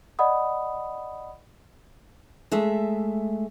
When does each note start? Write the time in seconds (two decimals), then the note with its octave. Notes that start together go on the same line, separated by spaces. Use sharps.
0.19 D5 D#5 F#5 B5 D#6
2.52 G#3 A3 E5